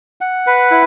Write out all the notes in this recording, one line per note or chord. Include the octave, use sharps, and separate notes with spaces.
F#5
B4
E4